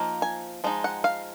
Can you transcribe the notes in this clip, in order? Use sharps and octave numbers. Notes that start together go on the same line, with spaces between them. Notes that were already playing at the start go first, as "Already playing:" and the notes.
Already playing: F3 A#3 D#4
G#5
F3 G#3 D#4
F#5
F5